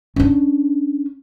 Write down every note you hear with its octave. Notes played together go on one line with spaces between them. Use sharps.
C#4 D4